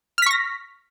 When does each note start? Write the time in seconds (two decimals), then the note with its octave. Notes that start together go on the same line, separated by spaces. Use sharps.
0.18 F6
0.22 B6
0.26 C#6
0.31 A#6